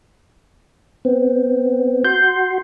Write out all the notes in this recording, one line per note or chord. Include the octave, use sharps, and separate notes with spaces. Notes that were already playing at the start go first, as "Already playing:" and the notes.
B3 C4
F#4 C6 G6